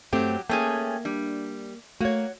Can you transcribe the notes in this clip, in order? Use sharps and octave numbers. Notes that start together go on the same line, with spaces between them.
G2 F#3 A3 C4 G4
A3 A#3 C#4 G#4 G5
G3 D4
A3 A#3 F#4 C#5 G#6